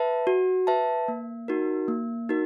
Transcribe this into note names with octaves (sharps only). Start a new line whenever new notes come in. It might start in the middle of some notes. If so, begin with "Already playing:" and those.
Already playing: B4 E5 A5
F#4
B4 E5 A5
A#3
D#4 F#4 A#4
A#3
D#4 F#4 A#4